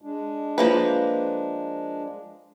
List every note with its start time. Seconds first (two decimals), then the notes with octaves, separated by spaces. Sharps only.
0.02 G#3 D4
0.58 F3 A#3 B4